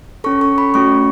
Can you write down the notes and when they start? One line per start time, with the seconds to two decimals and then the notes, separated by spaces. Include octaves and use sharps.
0.24 C#4 A4 C#6
0.41 C#6
0.58 B5
0.74 A3 C#4 F#4 C#6